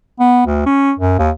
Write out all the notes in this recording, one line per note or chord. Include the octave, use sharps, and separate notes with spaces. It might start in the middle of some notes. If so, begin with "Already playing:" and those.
B3
D2
C#4
F#2
D#2